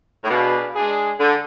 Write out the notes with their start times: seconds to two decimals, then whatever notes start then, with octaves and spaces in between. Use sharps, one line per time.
0.23 A2
0.28 B2 D4 G#4 B4 D5 F5
0.74 G#3 D4 G#4
1.19 D3